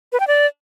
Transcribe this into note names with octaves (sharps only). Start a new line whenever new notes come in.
B4
G5
D5